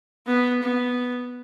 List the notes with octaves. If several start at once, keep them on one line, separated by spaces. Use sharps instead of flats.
B3
B3